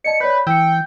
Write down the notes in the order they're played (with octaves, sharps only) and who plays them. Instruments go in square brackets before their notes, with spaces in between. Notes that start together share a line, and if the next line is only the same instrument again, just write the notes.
[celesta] D5 D#5 A5 [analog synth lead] C#7
[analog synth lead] B4 [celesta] C#5 D5 G6
[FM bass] E3 [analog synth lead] G5 [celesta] E6 C#7